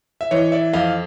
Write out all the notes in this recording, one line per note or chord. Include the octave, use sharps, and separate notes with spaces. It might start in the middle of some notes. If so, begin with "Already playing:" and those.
E5
E3 C#5 D#5
D5 E5
F2 D#5 F5